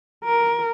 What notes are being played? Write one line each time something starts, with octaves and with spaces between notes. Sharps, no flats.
A#4